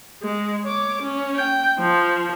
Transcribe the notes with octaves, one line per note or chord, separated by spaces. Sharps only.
G#3
C#5 D6
C#4
G5
F3